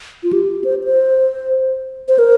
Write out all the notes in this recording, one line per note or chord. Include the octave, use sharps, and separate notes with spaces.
F4
G4
C5
C5
C5
A#4